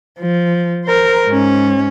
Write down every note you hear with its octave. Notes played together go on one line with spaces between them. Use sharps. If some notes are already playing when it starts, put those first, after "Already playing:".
F3
A#4 C5
G#2 C#4